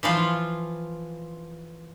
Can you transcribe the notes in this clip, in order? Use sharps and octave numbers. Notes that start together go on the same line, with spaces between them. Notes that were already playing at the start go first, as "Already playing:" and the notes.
E3 F3 F4